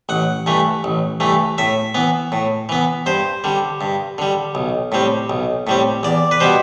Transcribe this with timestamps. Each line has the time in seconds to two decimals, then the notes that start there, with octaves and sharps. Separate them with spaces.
0.09 A1 F#5
0.46 G2 E3 A3
0.84 A1
1.20 G2 E3 A3
1.58 A2 E5
1.95 E3 B3
2.32 A2
2.69 E3 B3
3.06 G2 C5
3.44 D3 G3
3.81 G2
4.18 D3 G3
4.55 B1
4.92 A2 G3 C4
5.30 B1
5.67 A2 G3 C4
6.03 E2 D5
6.31 B4
6.40 B2 G3 B3 C5